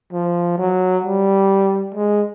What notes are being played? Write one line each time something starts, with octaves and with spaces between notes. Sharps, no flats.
F3
F#3
G3
G#3